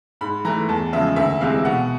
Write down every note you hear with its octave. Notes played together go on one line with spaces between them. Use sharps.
G#2 B5
E3 A3 A#5
E2 A5
C#3 F3 G#3 E5
D2 E5
C3 E3 G#3 F5
B2 F#5